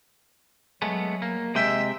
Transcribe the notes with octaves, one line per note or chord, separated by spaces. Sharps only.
F#3 G#3 A3 B3
A#3
C3 G#3 D#5 E5 G5